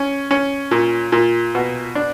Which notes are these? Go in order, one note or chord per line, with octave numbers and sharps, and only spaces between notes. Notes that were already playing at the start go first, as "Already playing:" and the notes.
Already playing: C#4
C#4
A#2
A#2
B2
D4